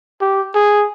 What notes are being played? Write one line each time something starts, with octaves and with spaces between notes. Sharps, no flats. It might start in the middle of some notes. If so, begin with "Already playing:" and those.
G4
G#4